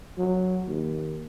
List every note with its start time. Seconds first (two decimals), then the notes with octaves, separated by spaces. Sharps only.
0.18 F#3
0.68 D#2